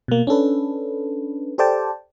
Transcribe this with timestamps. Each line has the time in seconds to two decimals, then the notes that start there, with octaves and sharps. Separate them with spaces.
0.08 B2 A#3
0.27 C#4 D4 A4 B4
1.58 G4 A4 C5 D5 G5 A5